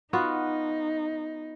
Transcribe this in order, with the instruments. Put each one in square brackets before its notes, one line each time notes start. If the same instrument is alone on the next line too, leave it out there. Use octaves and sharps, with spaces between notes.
[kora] B3 F4 F#4 [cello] D#4